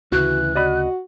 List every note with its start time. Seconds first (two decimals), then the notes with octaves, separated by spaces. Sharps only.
0.12 D2 C#3 E3 F#4 F#6
0.55 F#4 D5 D#5 B5